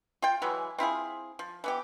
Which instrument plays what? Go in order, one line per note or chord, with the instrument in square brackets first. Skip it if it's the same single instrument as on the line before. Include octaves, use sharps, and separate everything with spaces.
[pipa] F4 G5
E3 F#3 G#3 E4
C4 E4 F4 G#4
F3
E3 B3 G4